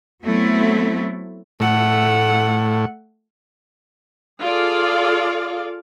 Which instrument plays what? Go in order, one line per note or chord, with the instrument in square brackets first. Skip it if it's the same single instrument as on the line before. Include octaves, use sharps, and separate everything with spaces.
[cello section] F#3 A3 B3 C4 E4
[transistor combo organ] A2 [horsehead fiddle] A3 F#5
[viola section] F4 G#4 A4 D5 F5